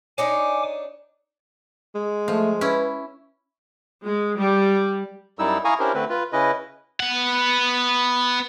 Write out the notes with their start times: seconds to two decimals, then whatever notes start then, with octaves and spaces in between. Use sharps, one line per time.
0.18 D4 D#4 C#5 G#5 D6
1.95 G#3
2.28 F3 A3
2.61 C#4 E4 B4
4.03 G#3
4.38 G3
5.39 F#2 G3 D#4 E4 E6
5.65 E4 F5 G#5 A#5 C#6 D#6
5.80 C#4 D4 E4 G4 A#4 C5
5.94 D3 A3 C4 B4
6.09 F4 B4
6.33 C#3 C#4 E4 B4 D#5
7.00 B3 F#5